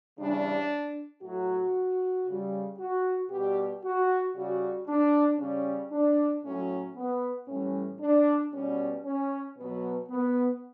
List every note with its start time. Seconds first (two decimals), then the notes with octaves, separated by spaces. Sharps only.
0.18 C#3 E3 G3 D4
1.22 A2 F#3 F#4
2.26 C#3 G3
2.79 F#4
3.30 B2 G3 G4
3.84 F#4
4.35 C#3 G3 F#4
4.88 D4
5.39 C#3 G3 C#4
5.91 D4
6.44 A2 F#3 C#4
6.96 B3
7.48 A2 E3 G3 C#4
8.00 D4
8.53 B2 G3 C#4
9.04 C#4
9.57 B2 F#3 B3
10.09 B3